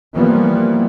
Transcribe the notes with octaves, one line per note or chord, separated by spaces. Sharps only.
E3 F3 G3 A#3 B3